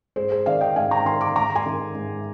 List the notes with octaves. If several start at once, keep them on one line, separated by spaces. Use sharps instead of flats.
G#2 G#4 C5
G#4 C5
D#3 D5 F5
D#5 G5
G#2 F5 G#5
G5 A#5
D#3 G#5 C6
A#5 D6
G#2 A#5 D6
G#5 C6
D#3
G#2